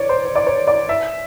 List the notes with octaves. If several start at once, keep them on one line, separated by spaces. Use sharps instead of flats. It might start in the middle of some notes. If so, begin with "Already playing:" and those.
Already playing: C#5 D5
C5
C5
D5
C#5
D5
E5